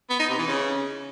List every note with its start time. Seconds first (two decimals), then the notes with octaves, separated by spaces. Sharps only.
0.10 B3
0.19 D#4
0.29 C3
0.38 E3
0.48 C#3